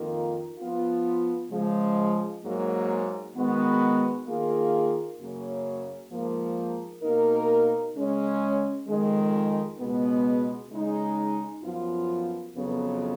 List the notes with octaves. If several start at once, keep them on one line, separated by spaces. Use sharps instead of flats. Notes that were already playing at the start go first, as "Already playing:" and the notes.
Already playing: F2 D#3 A#3 F4 A#4
F3 B3 F4
C#3 F3 G#3
G#2 F#3 A#3
D#3 G#3 B3 F#4
D#3 A#3 F4 G#4
F#2 C#3 F#3 A#3 C#4
G#2 F3 A#3
B2 A#3 D#4 A#4
C#3 G#3 C#4
F2 D#3 G#3
C#2 B2 G#3 B3
C#3 G#3 D#4 G#4
F#2 F3 B3 F4
F2 C#3 F#3 B3